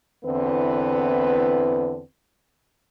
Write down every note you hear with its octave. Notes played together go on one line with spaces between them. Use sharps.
E2 D3 B3 C4 E4 B4